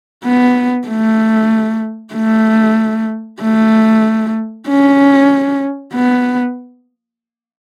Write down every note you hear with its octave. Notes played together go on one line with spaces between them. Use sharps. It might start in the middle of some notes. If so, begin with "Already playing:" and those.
B3
A3
A3
A3
C#4
B3